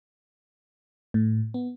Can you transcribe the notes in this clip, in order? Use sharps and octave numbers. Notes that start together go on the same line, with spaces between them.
A2
B3